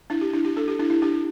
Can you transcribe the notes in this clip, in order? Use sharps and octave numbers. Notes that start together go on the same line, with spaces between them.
D4 E4
G4
D4 E4
G4
D4 A4
G4
D4 E4
E4
D4 G4